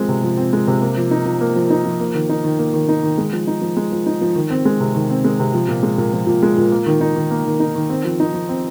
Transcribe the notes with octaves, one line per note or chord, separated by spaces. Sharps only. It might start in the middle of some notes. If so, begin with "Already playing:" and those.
Already playing: F3 G#3 C4
C3
F3
C4
G#3
C3
A#3
F3
D#4
F3
A#3
F3
D#4
F3
A#3
D#3
D#4
D#3
A#3
D#3
D#4
D#3
G#3
F3
D#4
F3
G#3
F3
D#4
F3
D#3
C4
G#3
C3
D#3
C4
G#3
C3
F3
A#2
G#3
A#2
F3
A#2
G#3
A#2
A#3
D#3
D#4
D#3
A#3
D#3
D#4
D#3
C4
F3
D#4
F3
C4